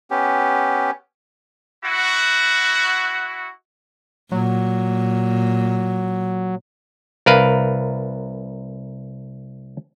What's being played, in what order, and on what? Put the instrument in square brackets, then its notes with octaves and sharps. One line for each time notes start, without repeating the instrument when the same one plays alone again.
[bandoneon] B3 C#4 G4
[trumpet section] E4 F#4
[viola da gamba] A#2 [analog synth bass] F#3
[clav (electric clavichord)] C2 A#4 B4 F5